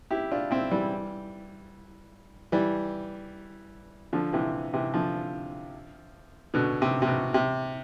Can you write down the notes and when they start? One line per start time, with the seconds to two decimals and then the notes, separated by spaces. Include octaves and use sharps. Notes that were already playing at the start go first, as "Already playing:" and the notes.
0.11 E4 G4
0.31 D4 F4
0.51 C4 E4
0.71 E3 G3
2.52 E3 G3
4.13 D3 F3
4.33 C3 E3
4.74 C3 E3
4.94 D3 F3
6.54 B2 D3
6.82 C3
7.02 C3
7.07 B2
7.34 C3